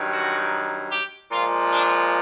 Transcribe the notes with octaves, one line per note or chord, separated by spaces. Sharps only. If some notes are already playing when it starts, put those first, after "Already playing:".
Already playing: G2 D#3 F#3
F#4
G4
A#2 F3 G#3 F4
D4